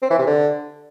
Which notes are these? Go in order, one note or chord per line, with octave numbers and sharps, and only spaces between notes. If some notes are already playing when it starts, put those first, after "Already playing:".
C4
E3
C3
D3